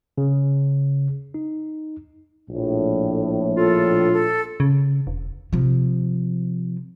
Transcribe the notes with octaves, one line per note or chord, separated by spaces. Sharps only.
C#3
D#4
A#1 A2
F4 A4
A4
C#3
E1
C3 F3